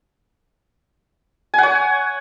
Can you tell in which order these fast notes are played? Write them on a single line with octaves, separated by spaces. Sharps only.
G#5 F#5 C#5